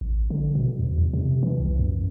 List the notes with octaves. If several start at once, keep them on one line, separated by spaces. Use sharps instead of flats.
A1
D3
B2
E2
E2
C3
E3
C2
F#2